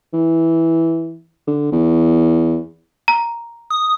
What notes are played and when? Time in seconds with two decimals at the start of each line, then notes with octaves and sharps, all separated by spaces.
0.14 E3
1.47 D3
1.72 E2
3.08 A#5
3.70 D#6